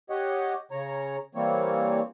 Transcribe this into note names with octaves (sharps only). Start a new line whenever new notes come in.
G4 C#5 D#5 F#5
C#3 C#5 A#5
E3 G3 A#3 C4 C#5